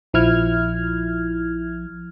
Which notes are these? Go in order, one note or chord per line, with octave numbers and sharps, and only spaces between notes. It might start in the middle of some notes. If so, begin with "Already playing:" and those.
A#1 F3 E4 F6 G#6